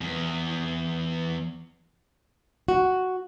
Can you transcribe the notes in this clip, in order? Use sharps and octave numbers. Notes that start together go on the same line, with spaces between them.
E2
F#4